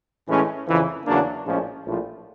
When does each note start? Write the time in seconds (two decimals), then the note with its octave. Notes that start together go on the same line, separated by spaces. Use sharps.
0.27 A2 E3 G#3 C#4
0.67 F2 C#3 E3
1.06 E2 C#3 F#3 A#3 D4
1.44 A#1 A2 F3 G#3 C#4
1.84 A#1 A2 F3